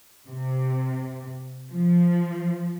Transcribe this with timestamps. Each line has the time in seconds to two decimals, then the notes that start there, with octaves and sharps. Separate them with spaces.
0.27 C3
1.72 F3